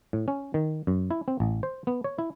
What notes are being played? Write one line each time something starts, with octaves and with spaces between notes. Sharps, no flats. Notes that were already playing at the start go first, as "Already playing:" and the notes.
A2
C#4
D#3
F#2
E4
C4
A1
C5
B3
C#5
E4